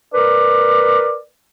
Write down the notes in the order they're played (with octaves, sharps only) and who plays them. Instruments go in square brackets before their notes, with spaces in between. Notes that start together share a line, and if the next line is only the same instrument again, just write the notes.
[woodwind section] A#4 B4 D5